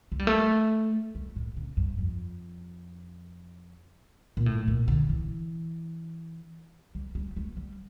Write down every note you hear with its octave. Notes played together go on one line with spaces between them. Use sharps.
A3
G3
A3
G3
A2
C#3
G2
F2
A#2
A2
A#2
D3
E3
G3
G3
A3
G3